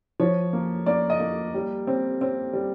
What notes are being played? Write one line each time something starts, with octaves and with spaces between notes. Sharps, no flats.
F3 C#5
A#3
A#3 D5
D#5
A#3
G3
C4
C4
G3